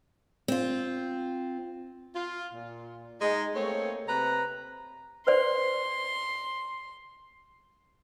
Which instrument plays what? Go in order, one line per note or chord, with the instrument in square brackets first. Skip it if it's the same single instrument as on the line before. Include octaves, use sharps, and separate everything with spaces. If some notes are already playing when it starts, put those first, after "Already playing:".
[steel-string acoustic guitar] C4 F4
[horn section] F4
A#2
G#3 D#4
A3 A#3 C4 C#5
C3 C4 B4 A#5
[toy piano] B4 C5 D5 [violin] C6